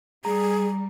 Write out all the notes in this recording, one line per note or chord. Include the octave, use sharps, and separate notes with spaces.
G3 G#4 A#5